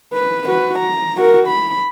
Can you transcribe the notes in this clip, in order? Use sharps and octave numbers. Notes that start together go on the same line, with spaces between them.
B4
F#4 B4
A#5
F#4 A#4
B5